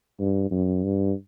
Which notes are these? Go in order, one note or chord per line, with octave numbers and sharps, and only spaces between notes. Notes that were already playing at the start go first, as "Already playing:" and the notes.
G2
F#2
G2